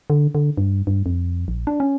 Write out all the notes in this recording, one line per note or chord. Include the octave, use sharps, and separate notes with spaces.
D3
D3
G2
G2
F2
A#1
D4
C#4